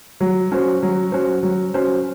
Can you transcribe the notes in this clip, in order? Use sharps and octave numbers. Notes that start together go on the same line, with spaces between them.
F#3
C#4 F#4 C5
F#3
C#4 F#4 C5
F#3
C#4 F#4 C5